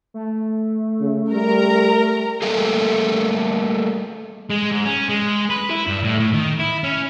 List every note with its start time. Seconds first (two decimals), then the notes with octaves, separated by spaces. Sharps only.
0.14 A3
1.00 C#3
1.32 G3 A#4 A#5
2.42 G3 A3 A#3 G#4 A4
4.50 G#3
4.71 G#2
4.85 C#4
5.09 G#3
5.50 B4
5.70 E4
5.87 G2
6.03 A2
6.20 A2
6.34 D#3
6.59 E4
6.84 C#4